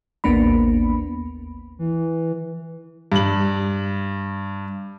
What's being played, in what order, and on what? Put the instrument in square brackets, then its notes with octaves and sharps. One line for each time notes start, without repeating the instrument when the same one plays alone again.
[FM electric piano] A1 D#2 A#3 B3 D4 B5
[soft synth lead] E3
[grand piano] G2 F#7